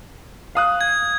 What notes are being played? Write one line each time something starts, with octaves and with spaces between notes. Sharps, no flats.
F5 D#6 F#6
G#6